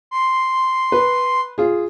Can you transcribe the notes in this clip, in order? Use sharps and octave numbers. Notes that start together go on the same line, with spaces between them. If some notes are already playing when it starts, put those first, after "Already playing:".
C6
B4
F4 G#4